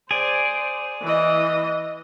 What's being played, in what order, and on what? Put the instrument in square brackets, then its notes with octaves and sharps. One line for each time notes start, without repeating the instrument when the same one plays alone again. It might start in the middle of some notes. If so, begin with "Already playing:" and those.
[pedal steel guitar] G#4 D5 [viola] C5
[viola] E3 D#5